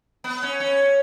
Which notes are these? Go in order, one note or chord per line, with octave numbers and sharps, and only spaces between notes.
B3
C#4
C#4